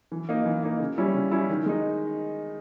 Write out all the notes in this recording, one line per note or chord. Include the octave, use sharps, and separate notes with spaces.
E3
A#3 D#4
E3
A#3 D#4
C#3
G3 C#4 E4
C#3
G3 C#4 E4
D#3
G#3 D#4